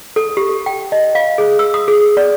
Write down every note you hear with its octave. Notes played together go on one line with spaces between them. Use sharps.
A4
G4
G5
D#5
F5
G#4
E6
D#6
G#4
D5